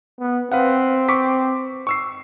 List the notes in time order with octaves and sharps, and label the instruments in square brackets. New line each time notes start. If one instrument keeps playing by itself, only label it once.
[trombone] B3
[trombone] C4 [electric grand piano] B4 F5 F#5
[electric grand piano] C#6 D6 B6
C#6 E6 C7